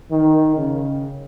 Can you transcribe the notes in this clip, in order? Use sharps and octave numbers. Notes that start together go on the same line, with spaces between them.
D#3
C#3